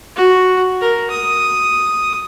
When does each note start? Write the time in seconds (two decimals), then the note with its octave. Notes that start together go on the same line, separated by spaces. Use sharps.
0.16 F#4
0.81 A#4
1.11 D#6